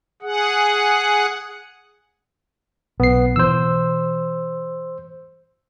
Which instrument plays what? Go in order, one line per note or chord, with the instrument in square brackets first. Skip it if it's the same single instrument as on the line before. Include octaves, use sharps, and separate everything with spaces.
[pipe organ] G#4 F#5
[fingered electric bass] B1 [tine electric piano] B3 C7
[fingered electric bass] B2 E3 [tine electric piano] C5 E6